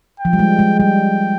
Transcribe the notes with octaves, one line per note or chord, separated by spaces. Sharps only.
G5
F3
G3
G#3
G#3
G3 G5